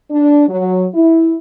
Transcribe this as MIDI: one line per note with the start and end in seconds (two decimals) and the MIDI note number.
0.11 0.45 62
0.48 0.87 54
0.94 1.36 64